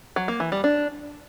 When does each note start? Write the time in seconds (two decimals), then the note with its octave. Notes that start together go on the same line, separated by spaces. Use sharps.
0.16 F#3
0.28 A#3
0.40 E3
0.52 G3
0.64 D4